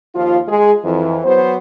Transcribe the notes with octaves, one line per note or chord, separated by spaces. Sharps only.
D#2 F3 F4
G#3 G#4
F2 E3
F#3 B3 C5